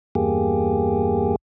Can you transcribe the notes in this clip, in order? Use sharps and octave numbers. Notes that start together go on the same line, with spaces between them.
E2 G2 A#3 G4 G#4